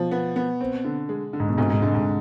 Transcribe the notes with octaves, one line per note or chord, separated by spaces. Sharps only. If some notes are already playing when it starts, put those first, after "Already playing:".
Already playing: B2 F3
B3
B3
C4
D3
G#3
D3
G#2
B2
D2 G#2 C3
G#2
G#2 D3
G#2